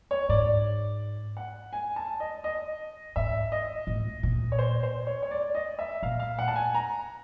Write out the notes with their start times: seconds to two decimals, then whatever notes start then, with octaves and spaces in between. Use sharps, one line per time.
0.11 C#5
0.29 G#2 D5
1.37 F#5
1.73 G#5
1.96 A5
2.20 D#5
2.44 D#5
3.16 G#2 E5
3.52 D#5
3.87 A2
4.23 A#2
4.52 C#5
4.59 C5
4.83 C5
5.07 C#5
5.23 C#5
5.31 D5
5.55 D#5
5.79 E5
6.03 A#2 F5
6.20 F5
6.39 F#5
6.48 A5
6.56 G#5
6.75 A#5